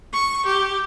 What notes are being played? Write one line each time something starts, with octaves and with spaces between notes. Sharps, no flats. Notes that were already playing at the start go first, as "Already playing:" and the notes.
C#6
G4